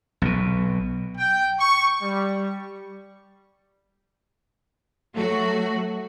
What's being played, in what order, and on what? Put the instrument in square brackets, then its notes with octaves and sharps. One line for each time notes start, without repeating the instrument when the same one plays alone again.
[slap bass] B1 B2
[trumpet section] G5
C#6
G3
[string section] F#3 A3 F#4